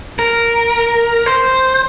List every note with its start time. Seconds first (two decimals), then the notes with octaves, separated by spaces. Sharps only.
0.19 A#4
1.26 C5